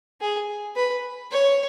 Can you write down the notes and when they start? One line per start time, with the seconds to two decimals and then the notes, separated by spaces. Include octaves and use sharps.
0.21 G#4
0.76 B4
1.31 C#5